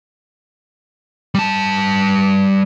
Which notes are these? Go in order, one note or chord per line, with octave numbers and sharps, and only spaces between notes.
G3 A5